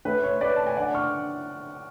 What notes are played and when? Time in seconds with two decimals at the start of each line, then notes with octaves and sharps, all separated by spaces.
0.05 A3 B4
0.23 C#5
0.41 A3 B4 D5
0.56 A5
0.67 G#5
0.77 D3 D5 F#5
0.95 C#6 F6